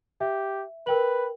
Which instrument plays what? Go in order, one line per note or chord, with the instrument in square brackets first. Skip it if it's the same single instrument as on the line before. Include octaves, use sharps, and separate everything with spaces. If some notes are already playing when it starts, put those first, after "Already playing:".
[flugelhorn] G4 [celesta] E5
[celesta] A#4 G5 F#7 [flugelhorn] B4